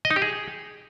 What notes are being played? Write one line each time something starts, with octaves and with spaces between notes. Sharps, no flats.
D#5
D#4
G4
G#4